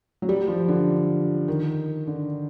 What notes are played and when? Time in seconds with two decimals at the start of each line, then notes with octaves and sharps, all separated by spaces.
0.22 F#3
0.29 G3
0.48 F3
0.68 D3
1.48 D#3
2.07 D3